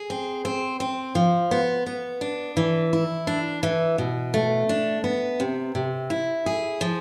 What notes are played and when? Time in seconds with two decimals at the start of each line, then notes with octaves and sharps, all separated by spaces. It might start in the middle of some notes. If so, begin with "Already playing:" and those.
Already playing: G#4
0.10 C4
0.45 C4
0.80 C4
1.15 F3
1.51 B3
1.86 B3
2.21 D4
2.57 E3
2.93 E4
3.27 D4
3.63 E3
3.98 B2
4.34 A3
4.69 D4
5.04 B3
5.40 C3
5.75 C3
6.10 E4
6.46 G#4
6.81 F3